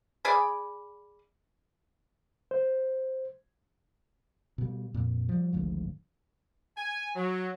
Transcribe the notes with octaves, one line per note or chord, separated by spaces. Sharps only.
G#4 D5 G#5 B5
C5
B2 G3
F2 A#2
F3 G3
G#1 D2 G#2 F3
G#5
F#3